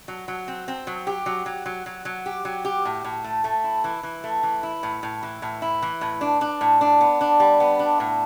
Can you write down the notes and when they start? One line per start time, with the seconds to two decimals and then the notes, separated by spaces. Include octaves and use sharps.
0.08 F#3
0.28 F#3
0.48 C4
0.68 C4
0.87 F#3
1.07 G4
1.26 F#3
1.46 F#3
1.66 F#3
1.86 F#3
2.05 F#3
2.26 G4
2.45 F#3
2.65 G4
2.85 A2
3.04 A2
3.24 A3
3.44 A3
3.64 E4
3.84 E3
4.03 E3
4.24 A3
4.43 E3
4.63 E4
4.83 A2
5.03 A2
5.23 E3
5.42 A2
5.62 E4
5.82 E3
6.01 A2
6.21 D4
6.41 D4
6.61 A2
6.81 D4
7.01 B3
7.21 D4
7.40 G3
7.60 B3
7.79 D4
8.00 A2